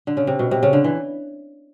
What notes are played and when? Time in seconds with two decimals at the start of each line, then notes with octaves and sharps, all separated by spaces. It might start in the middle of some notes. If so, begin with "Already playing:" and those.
0.07 D3
0.17 C#3
0.27 C3
0.39 B2
0.51 C3
0.63 C#3
0.73 D3
0.84 E3